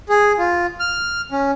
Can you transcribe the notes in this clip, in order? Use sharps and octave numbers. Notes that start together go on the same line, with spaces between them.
G#4
F4
F6
C#4